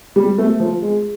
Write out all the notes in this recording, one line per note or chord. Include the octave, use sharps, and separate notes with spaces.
G3
A3
F3
G#3